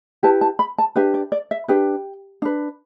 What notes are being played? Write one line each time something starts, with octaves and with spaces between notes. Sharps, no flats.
E4 G4 B4 A5
A5
B5
A5
D4 G4 B4 E5
D5
D5
E5
D4 G4 B4 G5
D4 B4